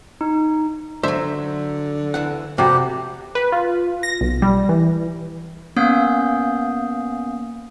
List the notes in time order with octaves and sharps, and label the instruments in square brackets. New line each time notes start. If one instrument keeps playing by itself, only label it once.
[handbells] D#4
[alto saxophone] D3 [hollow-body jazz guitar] F#3 C5 [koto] E5
[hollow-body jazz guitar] D2 E3 F#5
[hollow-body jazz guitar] F2 G3 [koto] C3 [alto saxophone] F#4 [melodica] G4
[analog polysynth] B4
F4
A#6
B1
G3
E3
[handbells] A#3 B3 C#4 F5 D#6 G6